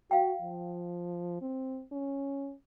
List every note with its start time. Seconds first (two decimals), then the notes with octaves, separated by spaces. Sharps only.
0.11 F#4 F5 G5
0.41 F3
1.41 C4
1.92 C#4